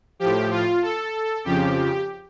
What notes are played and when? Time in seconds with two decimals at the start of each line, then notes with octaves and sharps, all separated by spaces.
0.20 A2 F3 G4
0.51 F4
0.82 A4
1.44 F2 C#3 F3 G4